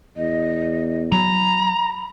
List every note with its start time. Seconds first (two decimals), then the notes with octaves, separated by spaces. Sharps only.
0.17 E2 D#5
1.12 F#3 A#5 B5